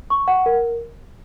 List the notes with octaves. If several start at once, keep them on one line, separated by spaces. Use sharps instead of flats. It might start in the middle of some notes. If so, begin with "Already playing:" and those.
C#6
F#5
A#4